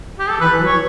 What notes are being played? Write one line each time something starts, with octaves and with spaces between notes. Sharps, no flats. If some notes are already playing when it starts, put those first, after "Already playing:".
G4
A4
E3 B4
E3
F#3
C#5